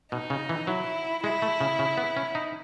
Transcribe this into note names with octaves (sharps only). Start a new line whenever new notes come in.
B2 D#4
C#3
E3
F#3 E4
G#3 E4
A3
C#3
C#3
B3
C#4
D#4